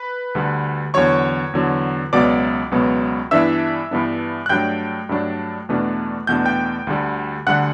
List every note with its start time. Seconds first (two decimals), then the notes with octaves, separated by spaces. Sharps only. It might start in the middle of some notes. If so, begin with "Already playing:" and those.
Already playing: B4
0.35 D2 D3 G3
0.94 E2 D3 F#3 C#5 C#6
1.54 E2 D3 F#3
2.13 C#2 B2 F#3 B3 D5 D6
2.71 C#2 B2 F#3 B3
3.31 G2 E3 B3 D4 E5 E6
3.91 G2 E3 B3 D4
4.46 F#6
4.49 G2 F#3 A3 D4 G5 G6
5.09 G2 F#3 A3 D4
5.69 E2 B2 A3 D4
6.27 E2 B2 A3 D4 G6
6.46 G5 G6
6.87 D2 D3 G3
7.47 D2 D3 G3 F#5 F#6